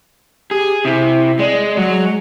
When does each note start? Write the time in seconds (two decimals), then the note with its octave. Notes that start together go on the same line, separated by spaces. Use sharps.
0.51 G4 G#4
0.85 C3 E4
1.39 G#3 D5
1.77 F#3 G#3